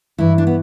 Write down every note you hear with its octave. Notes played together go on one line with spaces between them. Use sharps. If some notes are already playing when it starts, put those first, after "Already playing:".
G2 E3 E4
D4
B3